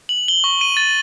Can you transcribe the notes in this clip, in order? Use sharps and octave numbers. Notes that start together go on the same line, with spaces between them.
F#7
G7
C#6
D#7
A6